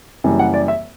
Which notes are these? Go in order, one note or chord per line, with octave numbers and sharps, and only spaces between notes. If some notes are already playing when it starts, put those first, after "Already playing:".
F#1 F#2 E3 G3
F#5
D5
E5